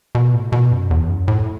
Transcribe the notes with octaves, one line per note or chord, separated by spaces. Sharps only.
B2
A2
B2
F#2
E2
F#2
A2